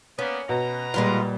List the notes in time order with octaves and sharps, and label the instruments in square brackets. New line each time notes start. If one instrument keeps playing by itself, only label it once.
[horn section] A#3 B3 [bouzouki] C#4
[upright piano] B2 [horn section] B4 A#5
[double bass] A#2 G3 [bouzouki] G#3 B3 F4